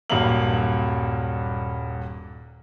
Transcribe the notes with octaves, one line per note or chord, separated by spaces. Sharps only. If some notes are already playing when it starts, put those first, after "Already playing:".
D#1 G2 F#3 A#3 F7 F#7